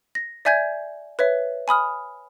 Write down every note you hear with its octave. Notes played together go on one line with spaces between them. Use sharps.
A#6
D5 E5 G#5 G6 G#6
B4 C#5 E5
G#5 B5 D#6 F6